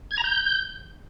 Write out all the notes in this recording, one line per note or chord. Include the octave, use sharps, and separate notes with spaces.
G#6
A#5
G6